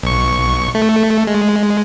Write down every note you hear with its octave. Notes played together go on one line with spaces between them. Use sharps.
B1 C#6
A3
G#3